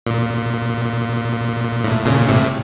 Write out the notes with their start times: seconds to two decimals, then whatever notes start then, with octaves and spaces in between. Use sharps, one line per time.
0.07 A#2
1.84 A2
2.06 A#2 C#3
2.28 A2 C3